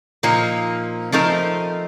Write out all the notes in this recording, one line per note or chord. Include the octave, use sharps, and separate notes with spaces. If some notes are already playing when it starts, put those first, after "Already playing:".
A#2 F3 A#3 D#4
F3 A3 C4 D#4 A#4